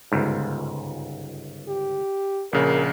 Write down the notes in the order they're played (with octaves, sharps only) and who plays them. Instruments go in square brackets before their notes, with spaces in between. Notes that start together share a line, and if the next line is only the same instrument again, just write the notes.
[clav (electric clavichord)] G1 C#2 G#2
[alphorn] G4
[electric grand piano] A#1 C#3 [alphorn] A#4